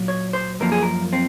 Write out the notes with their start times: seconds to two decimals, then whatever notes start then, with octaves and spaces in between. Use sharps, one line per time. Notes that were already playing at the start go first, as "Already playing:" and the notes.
Already playing: A#2 F#3
0.08 C#5
0.33 C5
0.60 F#2 F3 A#3 A#4
0.72 G#4
0.83 A#4
1.13 C4